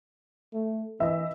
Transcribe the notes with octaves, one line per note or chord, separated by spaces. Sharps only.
A3
E3 D#5 E5